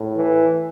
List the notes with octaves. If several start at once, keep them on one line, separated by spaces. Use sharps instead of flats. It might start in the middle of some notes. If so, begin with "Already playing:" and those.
Already playing: A2
E3